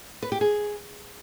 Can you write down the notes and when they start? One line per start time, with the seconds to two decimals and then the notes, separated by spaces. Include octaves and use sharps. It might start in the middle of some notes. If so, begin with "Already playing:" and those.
0.23 B4
0.32 G4
0.41 G#4